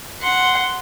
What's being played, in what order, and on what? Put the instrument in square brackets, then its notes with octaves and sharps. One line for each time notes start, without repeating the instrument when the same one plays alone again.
[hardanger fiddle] F#5 C6